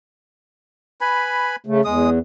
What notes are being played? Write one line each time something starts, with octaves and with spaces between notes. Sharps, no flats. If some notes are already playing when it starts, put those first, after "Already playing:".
B4 G#5 B5
C#3 A3
E2 G#3 D#6